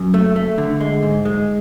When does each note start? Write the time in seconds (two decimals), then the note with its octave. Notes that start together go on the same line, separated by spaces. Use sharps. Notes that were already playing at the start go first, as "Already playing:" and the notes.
Already playing: F#2
0.14 A3
0.36 A3
0.58 D3
0.80 G#3
1.03 G#2
1.25 G#3